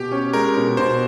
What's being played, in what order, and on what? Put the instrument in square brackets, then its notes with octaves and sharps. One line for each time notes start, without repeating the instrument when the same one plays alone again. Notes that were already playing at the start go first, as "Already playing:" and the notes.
Already playing: [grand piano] B2 [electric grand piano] G4
[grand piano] C#4
[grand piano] G#3 [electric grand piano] A#4
[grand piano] B2
[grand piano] B2 [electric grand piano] C5